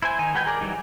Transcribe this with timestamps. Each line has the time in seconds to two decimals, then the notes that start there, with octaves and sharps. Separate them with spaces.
0.02 E4 C5 G#5
0.19 D#3 D#4 G#5
0.34 G#3 F#4 B4 G5 G#5
0.46 G#4 A#4 D5
0.61 E3 F#3 G3 D#4